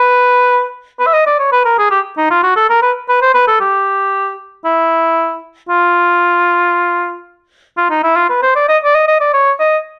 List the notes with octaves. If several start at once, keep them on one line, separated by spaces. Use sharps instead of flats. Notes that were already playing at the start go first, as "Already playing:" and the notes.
Already playing: B4
B4
E5
D#5
D5
C#5
B4
A#4
G#4
G4
D#4
F4
F#4
A4
A#4
B4
B4
C5
B4
A4
G4
E4
F4
F4
D#4
E4
F4
B4
C5
D5
D#5
D5
D#5
D#5
D5
C#5
D#5